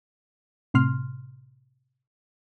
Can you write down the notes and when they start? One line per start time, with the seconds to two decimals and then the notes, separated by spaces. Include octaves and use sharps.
0.74 A2 C3 C6 F6